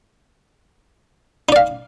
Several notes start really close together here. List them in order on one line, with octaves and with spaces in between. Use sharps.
D#4 D5 F5